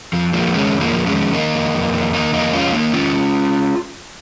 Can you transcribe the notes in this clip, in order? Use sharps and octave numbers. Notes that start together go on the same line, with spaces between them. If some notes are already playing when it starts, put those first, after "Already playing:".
F2 F3
D#3 F3 A#3
D#3 G#3 C#4
F2
F3 A#3
F2
G#3 C#4
D#3
D#3 A#3 D#4
F2
F2
D#3
D#3 A#3 D#4
F2 A#3 D#4
F2 C#4 F4
D#3 A#3 D#4
D#3 C#4 F4